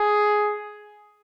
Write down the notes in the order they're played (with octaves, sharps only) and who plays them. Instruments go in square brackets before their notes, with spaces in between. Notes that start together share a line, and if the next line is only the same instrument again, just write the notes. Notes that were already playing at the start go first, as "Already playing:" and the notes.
Already playing: [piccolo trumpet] G#4